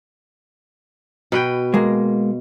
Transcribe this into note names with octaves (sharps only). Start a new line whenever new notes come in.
B2 B4 G5
G#3 A#3